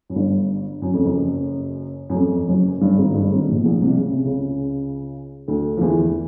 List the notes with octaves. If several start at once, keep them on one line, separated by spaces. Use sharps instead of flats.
F#2
G1 G2
F#2
F2
F#1 F#2
F#2
F2
F#1 F#2
G1 G2
G#1 G#2
G1 G2
G#1 G#2
A#1 A#2
B2
A#1 A#2
C2 C3
C#3
C3
C#2 C#3
D2 D3
F3
E2 E3